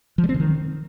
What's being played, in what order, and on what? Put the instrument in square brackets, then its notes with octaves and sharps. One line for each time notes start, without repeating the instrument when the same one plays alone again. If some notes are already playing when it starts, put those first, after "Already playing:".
[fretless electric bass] F3
G3
C4
D3
D#3